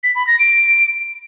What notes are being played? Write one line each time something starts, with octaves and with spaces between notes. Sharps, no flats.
B6
B5
A#6
D7